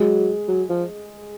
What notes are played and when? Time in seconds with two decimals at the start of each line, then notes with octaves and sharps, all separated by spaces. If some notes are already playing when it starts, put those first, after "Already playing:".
Already playing: F#3 G#3
0.48 F#3
0.69 F3